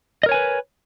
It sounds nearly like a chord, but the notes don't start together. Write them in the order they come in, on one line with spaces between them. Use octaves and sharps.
D#5 A#4 C#5 G#5 B4